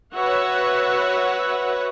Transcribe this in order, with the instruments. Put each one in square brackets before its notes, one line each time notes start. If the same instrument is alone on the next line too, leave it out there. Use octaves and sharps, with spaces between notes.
[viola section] F#4 B4 C#5 E5 F#5